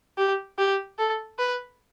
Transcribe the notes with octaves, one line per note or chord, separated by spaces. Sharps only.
G4
G4
A4
B4